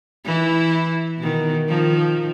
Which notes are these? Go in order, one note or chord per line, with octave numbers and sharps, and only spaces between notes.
E3 E4
B2 D#3
D#3 F3